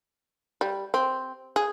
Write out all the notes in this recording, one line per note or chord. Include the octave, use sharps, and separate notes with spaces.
G3
C4
G#4